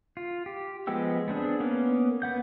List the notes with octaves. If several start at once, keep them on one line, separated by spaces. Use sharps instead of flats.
F4
G4
F3 G#3 B3 G5 E6
B3 C4 D4 G#4
A#3 B3 C#4
B3 F#5 G6